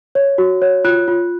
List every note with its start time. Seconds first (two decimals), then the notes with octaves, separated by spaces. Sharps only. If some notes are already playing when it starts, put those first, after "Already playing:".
0.15 C#5
0.38 F#4
0.62 C#5
0.84 F4 F#6
1.08 F4